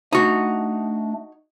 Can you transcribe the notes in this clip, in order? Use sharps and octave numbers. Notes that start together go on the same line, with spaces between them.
A3 D4 D#4 F#4